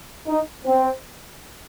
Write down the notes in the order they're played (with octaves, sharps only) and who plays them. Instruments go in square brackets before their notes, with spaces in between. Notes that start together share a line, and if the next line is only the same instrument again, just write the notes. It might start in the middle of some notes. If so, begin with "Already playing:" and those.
[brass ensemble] D#4
C4